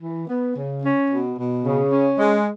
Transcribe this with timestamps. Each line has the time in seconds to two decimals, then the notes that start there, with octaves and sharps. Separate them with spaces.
0.01 E3
0.28 B3
0.55 C#3
0.83 C#4
1.09 B2
1.38 B2
1.65 C#3
1.92 C#4
2.19 G#3